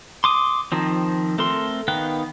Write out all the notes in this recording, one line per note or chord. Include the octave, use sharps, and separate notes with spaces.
C6 D6 D#6
D#3 F3 C4
A3 C4 A4 A#4 C6
D#3 B3 F5 G5 F#6